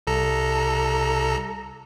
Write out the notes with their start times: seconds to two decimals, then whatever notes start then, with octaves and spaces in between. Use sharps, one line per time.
0.07 C2 A4 A#5